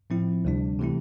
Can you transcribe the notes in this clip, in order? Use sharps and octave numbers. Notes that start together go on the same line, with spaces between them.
A2 F3 C4 E4
D2 C3 G3 D4
C3 E3 A3 C4 E4